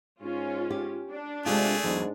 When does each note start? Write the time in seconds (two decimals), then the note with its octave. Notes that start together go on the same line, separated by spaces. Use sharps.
0.22 G#2 C#4 F4
0.70 G4
1.11 D4
1.46 C3 G#3 A3 F4 G#4
1.84 E2 G#2 F#3